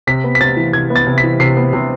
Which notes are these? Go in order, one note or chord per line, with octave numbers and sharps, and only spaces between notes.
C3 B6
B3
B6
C3 A6
E3
C3 G#6
B3
A6
C3
B6
E3
C3 C7
B3
C3